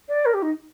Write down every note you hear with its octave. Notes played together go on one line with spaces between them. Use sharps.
D5
A#4
G4
D#4